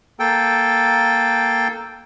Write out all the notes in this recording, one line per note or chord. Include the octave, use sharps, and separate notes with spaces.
A#3 A4 G5